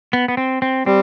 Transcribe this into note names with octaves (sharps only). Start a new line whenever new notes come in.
B3
B3
C4
C4
G3 C4